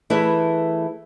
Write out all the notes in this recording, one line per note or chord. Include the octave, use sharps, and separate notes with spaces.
E3 A3 E4 G#4 B4